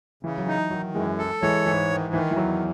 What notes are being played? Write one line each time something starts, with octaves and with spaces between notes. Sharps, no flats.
C#3 E3
F#3
E3 D#4
D#3 F#3
F#2 E3 G#3
A4
E3 G#3 C#5
G#2 E3
D#3
D#3 E3
E3
E2 F#3